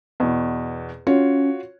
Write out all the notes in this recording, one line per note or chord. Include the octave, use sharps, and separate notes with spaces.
E2 B2
C#4 F4 F#4 C#5